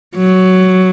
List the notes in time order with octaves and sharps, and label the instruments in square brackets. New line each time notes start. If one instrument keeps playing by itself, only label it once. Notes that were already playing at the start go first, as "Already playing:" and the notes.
[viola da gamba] F#3